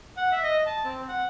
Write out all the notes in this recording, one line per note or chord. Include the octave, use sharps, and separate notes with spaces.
F#5
E5
D#5
A5
C4
F#5